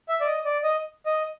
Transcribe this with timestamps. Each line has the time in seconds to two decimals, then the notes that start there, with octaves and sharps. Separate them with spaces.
0.09 E5
0.21 D5
0.27 D#5
0.45 D5
0.63 D#5
1.06 D#5